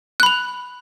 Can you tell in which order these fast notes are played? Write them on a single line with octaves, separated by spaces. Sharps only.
F#6 B5 F7